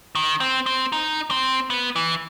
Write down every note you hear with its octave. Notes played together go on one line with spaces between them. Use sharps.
D#3
C4
C4
D#4
C4
B3
E3